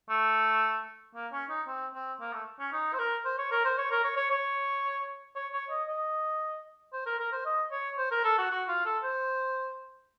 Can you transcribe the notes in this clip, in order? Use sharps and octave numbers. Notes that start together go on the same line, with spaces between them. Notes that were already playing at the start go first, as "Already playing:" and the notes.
A3
A#3
C#4
D#4
C4
C4
A#3
A3
C#4
D#4
C5
A#4
C5
C#5
A#4
C5
C#5
A#4
C#5
C#5
C#5
C#5
C#5
D#5
D#5
C5
A#4
A#4
C5
D#5
C#5
C5
A#4
A4
F#4
F#4
F4
A4
C5